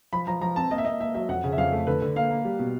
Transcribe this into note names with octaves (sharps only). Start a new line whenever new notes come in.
F3 B5
F3 A#5
F3 A#5
C4 A5
A#3 D#5
E5
A#3 D#5
A#3 E5
F#3 E5
F2 F#5
C#3
E5
F2 F5
A3
D3 B4
D3
A#3 F5
A#3
G3
B2